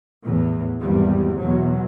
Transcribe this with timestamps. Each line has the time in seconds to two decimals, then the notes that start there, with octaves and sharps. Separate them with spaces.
0.24 E2 A2 E3
0.81 G#1 E2 G3
1.38 E2 B2 F#3